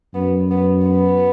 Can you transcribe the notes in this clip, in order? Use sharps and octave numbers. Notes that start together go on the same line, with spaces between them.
F#2 B3
B3
B3